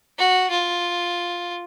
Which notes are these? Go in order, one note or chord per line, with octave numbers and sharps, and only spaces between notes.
F#4
F4